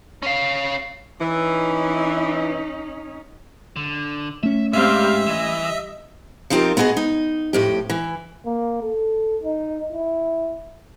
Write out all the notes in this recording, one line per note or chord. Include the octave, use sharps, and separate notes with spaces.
C#4 F5
E3 C#4 D#4
D3
A3 C#4 E5
G#2 G3 C4 E5 F5
E3 D#5
F3 C4 D#4 F4 G4 A#4
B3 E4 F#4 G#4 D#5
D#4
F2 A2 G4
E3
A#3
A4
D#4
E4